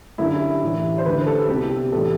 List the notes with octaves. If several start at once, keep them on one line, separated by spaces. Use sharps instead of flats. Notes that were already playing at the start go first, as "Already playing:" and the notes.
F#2 D3 G3 E4
A2 E3 G3
C5
D2 D3 G3 B4
A4
C2 B2 G3 G4
A2 E3 G3 A4